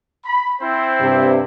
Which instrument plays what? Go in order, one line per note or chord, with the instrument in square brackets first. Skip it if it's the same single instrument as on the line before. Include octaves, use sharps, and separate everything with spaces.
[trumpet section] B5
C4 E4 C5
[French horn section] G2 C3